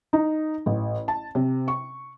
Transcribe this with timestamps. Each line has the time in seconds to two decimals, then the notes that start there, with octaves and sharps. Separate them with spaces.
0.13 D#4
0.66 A1
1.08 A5
1.35 C3
1.68 C#6